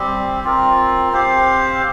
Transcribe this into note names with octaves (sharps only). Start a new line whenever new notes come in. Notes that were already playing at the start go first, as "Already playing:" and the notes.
Already playing: G3 C4 G4
C4 F4 A#4
C4 G4 C5 F5